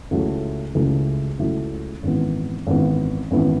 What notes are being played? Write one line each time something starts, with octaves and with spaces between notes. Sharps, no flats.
C#2 C#3 F#3 A3 E4
C#2 C#3 F#3 A3 E4
C#2 C#3 F#3 A3 E4
G#1 F#2 E3 B3
G#1 F#2 E3 B3
G#1 F#2 E3 B3